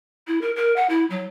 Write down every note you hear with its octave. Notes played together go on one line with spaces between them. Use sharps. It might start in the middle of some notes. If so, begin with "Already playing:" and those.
E4
A#4
A#4
F#5
E4
F#3